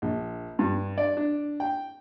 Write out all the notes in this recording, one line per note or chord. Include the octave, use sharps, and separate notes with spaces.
A#1
G2
D5
D4
G5